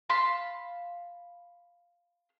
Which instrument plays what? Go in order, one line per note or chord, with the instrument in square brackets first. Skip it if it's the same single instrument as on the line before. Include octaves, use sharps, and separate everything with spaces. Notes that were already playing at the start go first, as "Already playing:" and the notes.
[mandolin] F5 A5 B5 C6